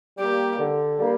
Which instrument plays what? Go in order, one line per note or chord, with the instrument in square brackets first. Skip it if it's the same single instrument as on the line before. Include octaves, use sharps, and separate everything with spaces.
[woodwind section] G3 A#3 [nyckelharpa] G4
[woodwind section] D3
G3 A#3